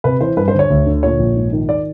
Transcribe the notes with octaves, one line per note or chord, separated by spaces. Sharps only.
C3 B4
E3 C5
G2 B4
C5
D3
C#5
D2
D3
A#2 C#5
A#1
G#2
D#3
D5